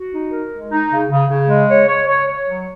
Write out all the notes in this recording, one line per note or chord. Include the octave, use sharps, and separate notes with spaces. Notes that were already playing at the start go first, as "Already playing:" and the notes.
Already playing: F#4
D#4
A#4
G#3
D#4
C#3
C#3
C#3
G#3
C#5
C#5
C#5
C#5
F#3